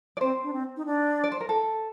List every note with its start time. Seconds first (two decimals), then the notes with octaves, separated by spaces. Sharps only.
0.17 D5
0.21 C4 C5
0.43 D4
0.53 C4
0.77 D#4
0.86 D4
1.24 D5
1.32 C5
1.41 A#4
1.49 A4